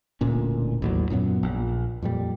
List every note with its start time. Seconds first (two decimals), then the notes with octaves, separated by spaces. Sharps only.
0.21 E1 D2 A#2 C#4
0.82 A1 D#2 F#3
1.10 F#2 A#2 F#3 B3
1.43 A#1
2.02 F2 A#2 G3